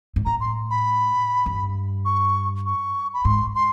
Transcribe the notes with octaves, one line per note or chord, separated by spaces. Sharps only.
G#2
A2 A#5
C6
B5
G2
C#6
C#6
B5
G#2 C6
C6